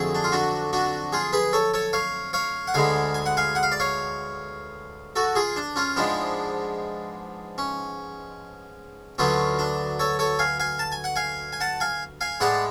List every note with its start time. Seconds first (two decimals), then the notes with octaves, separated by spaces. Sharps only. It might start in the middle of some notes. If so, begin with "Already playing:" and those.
Already playing: F2 D3 F#3 A3 G#4
0.15 D4
0.24 F4
0.32 D4 F#4
0.73 D4 F#4
1.13 F4 G#4
1.33 G#4 B4
1.53 A4 C#5
1.74 A4 C#5
1.93 C#5 F5
2.33 C#5 F5
2.68 F#5
2.74 D2 D3 G#3 B3 F5 G#5
3.14 G#5
3.26 F#5
3.37 F5 G#5
3.55 F#5
3.63 F5
3.72 D5
3.80 C#5 F5
5.16 F#4 A4
5.35 F4 G#4
5.56 D4
5.76 C#4 F4
5.96 G#2 F3 G#3 B3 D4
7.58 C#4
9.18 D2 D3 F#3 B3 C#4 F4
9.59 D4
9.99 A4 C#5
10.19 A4 C#5
10.39 F5 G#5
10.60 F5 G#5
10.79 A5
10.92 G#5
11.04 F#5
11.16 F5 G#5
11.53 G#5
11.60 F#5 A5
11.80 F5 G#5
12.21 F5 G#5
12.40 A2 G#3 B3 D5 F#5